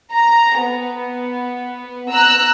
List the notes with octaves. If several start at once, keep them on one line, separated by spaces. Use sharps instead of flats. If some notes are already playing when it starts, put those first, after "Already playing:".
A#5
B3
A#5 E6 F#6